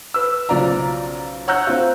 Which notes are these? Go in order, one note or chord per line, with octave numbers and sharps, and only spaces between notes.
B4 E6
B1 C#3 F3 D5 F5 A#5
C#5 F#5 A#5 E6 F#6 G6
C4 F4